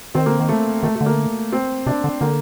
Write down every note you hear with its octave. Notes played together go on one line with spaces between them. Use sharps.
D#3 C4
D3 A#3
D#3
A3
D#3 A3
A3
D3
A#3
C4
C3 D4
D3
D3 A#3